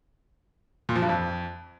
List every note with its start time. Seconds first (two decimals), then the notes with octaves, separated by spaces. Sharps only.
0.89 A#2
0.96 F3
1.02 G2
1.09 F2